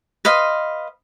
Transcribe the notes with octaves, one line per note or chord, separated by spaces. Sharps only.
B4 D#5 F5 C6